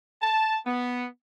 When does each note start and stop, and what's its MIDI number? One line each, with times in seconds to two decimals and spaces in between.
0.22 0.57 81
0.67 1.06 59